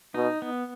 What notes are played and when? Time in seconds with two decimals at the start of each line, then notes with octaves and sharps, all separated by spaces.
0.14 B2 D#4
0.42 B3